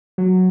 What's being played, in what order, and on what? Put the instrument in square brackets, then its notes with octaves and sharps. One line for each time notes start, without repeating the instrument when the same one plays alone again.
[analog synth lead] F#3